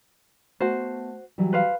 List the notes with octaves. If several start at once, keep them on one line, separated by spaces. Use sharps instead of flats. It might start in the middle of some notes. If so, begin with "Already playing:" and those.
A3 B3 F#4 C5 A5
E3 F#3 G3
B4 C5 F5